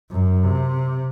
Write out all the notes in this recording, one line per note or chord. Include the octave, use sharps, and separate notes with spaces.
F#2
C3